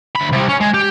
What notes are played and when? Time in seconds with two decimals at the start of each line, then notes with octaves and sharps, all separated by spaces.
0.15 D2 B5
0.32 C3 G3
0.48 C#4
0.60 G#3
0.74 G4